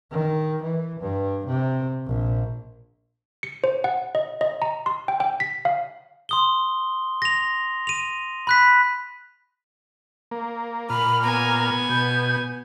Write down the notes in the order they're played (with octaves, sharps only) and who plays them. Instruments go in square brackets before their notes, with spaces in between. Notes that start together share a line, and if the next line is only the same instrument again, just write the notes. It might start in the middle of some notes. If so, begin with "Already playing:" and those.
[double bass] D#3
E3
G2
C3
A#1
[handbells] C#7
C5
F#5
D#5
D#5
A#5
C6
G5
G5
B6
F5
[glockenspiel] C6 D#6 G7
A#6 F7
D#7 F7
B5 F#6 B6
[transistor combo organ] A#3
[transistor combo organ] A#2 F6 [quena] B5
[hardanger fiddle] B3 G#5 [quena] A#5
[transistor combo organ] B2 [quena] G6